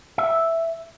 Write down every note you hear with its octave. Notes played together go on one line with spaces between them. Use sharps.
E5